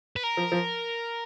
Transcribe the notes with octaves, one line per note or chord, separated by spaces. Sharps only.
B4
A#4
F3
F3